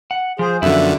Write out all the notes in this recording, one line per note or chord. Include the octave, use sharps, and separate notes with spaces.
F#5
F3 G#4 C5
F#2 D3 F3 B3 E4 E5